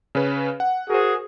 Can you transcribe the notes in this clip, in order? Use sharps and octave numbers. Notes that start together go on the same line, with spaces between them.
C#3 C#4 B4
F#5
F#4 G#4 A#4 C5